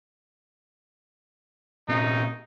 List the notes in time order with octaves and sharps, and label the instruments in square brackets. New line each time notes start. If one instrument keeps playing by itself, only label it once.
[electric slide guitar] A#2 C4 C#4 [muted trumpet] D#4